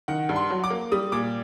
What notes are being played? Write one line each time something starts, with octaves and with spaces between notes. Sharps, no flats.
D#3 F#5
G2
C6
F#3
D6
A#3
G3 D#6
A#2 D6